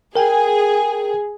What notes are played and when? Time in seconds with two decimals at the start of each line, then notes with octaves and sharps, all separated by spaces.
0.16 G#4 A#4 G5